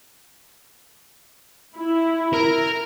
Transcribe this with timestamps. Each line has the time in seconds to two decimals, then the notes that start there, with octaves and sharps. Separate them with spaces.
1.76 E4
2.33 A#4